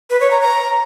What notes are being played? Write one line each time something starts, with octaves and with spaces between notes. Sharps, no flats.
B4
C#5
A#5
A#5